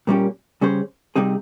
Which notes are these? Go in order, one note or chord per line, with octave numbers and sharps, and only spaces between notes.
A#2 G3 A#3 C#4 G4
C#3 G3 C#4 G#4 C5
C3 G3 C4 D#4 G#4